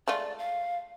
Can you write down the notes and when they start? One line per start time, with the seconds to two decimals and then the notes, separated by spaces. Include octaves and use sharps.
0.08 G#3 A3 F4 D5
0.38 F5